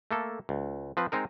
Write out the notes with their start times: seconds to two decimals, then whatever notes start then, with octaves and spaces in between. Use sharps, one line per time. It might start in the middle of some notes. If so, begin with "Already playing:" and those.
0.11 A3 A#3 A4
0.49 C#2
0.97 F3 C4 B4
1.12 G#3 C4 D#4 A#4